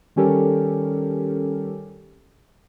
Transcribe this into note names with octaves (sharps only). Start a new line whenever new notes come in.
D#3 G3 C#4 G4 A4 A#4